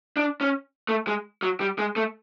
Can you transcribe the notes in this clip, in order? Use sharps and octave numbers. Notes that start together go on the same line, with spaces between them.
D4
C#4
A3
G#3
F#3
G3
G#3
A3